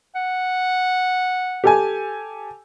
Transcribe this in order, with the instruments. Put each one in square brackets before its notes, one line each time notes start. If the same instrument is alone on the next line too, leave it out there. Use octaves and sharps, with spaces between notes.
[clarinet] F#5
[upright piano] G4 A4 G#5